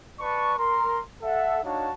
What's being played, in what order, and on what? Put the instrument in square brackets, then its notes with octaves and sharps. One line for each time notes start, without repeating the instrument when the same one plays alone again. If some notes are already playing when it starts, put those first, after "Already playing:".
[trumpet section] B4 D5 A5 C#6
A#4 A#5 C6
A4 E5 F#5
D4 D#4 F#4 C#5 F5 A5